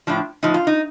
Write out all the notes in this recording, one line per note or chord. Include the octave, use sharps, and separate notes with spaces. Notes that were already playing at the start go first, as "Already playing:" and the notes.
A2 F3 D4
A2 F3 D#4
F4
D#4